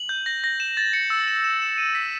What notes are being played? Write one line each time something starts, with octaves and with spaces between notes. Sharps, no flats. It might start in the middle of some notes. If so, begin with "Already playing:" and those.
Already playing: F#7
G6
A#6
A#6
E7
A6
C#7
E6
E7
E7
E7
D#7
B6